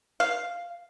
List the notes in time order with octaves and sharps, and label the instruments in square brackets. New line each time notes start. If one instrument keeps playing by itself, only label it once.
[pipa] F5